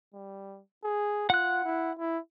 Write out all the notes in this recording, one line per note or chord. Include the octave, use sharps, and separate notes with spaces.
G3
G#4
F4 F#5 F#6
E4
E4